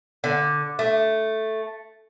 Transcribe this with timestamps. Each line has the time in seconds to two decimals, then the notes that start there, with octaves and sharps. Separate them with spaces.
0.24 D3
0.79 A3